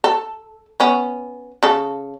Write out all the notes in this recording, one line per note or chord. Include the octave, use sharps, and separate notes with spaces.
A4
B3 C#4
C#3 A4